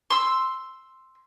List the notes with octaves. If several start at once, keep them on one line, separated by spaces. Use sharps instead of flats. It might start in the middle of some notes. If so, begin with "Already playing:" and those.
C6 E6